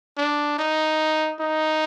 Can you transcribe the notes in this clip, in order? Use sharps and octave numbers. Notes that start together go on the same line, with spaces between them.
D4
D#4
D#4